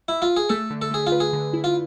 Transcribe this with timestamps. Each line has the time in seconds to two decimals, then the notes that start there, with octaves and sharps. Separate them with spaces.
0.08 E4
0.22 F4
0.37 G#4
0.49 A3 A4
0.70 D3
0.82 A4
0.91 A3 G#4
1.07 F4
1.12 B4
1.20 G#4
1.33 D3
1.53 E4
1.64 F4